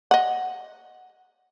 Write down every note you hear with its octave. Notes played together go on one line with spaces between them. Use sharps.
D#5 F#5